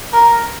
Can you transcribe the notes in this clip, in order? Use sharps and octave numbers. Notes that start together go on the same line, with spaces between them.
A#4